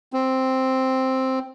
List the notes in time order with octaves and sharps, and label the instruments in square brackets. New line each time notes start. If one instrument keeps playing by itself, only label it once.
[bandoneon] C4